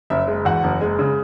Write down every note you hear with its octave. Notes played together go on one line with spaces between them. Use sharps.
F#1 E5
G#3
E2 F#4 F#5
F#1
G#3
C#3